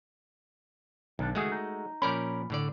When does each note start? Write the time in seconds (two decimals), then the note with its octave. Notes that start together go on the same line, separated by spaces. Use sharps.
1.19 B1 D#3 D4
1.35 C#2 D#3 G#3 A3 F#4 G#4
1.52 D#4
2.02 A#2 F3 C#4 A#4 D5 B5
2.50 A2 D3 D5